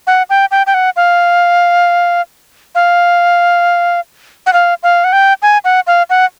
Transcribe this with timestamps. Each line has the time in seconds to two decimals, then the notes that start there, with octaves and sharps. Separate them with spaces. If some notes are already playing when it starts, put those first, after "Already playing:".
0.07 F#5
0.30 G5
0.51 G5
0.67 G5
0.74 F#5
0.96 F5
2.75 F5
4.46 F#5
4.53 F5
4.83 F5
5.04 F#5
5.13 G5
5.42 G#5
5.65 F#5
5.87 F5
6.10 F#5